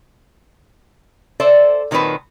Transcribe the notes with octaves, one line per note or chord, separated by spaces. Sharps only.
A4 C5 D5 E5
A#2 D#3 F#3 C4 B4 A5